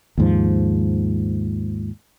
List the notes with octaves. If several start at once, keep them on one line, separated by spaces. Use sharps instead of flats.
D#2 G#2 F3